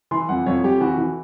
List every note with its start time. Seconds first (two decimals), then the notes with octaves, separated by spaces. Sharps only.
0.11 E3 C6
0.29 F2 F#5
0.46 F2 C#5
0.64 F2 G4
0.81 E3 F#4
0.98 E3